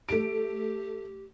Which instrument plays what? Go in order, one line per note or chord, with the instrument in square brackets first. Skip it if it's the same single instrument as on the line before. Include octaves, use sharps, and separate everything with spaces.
[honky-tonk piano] A3 D7 [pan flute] G4